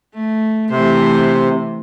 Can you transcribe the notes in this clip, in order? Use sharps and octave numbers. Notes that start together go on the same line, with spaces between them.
A3
C3 E3 A3 C5